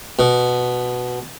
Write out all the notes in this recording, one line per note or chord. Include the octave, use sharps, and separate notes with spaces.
B2